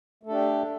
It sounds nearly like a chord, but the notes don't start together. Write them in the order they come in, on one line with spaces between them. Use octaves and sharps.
A3 A4 D4 G4